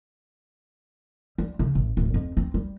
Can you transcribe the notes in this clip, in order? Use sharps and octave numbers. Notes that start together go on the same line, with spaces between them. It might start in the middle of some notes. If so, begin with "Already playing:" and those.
G3
C#3
A1
D1
F2
C4
G3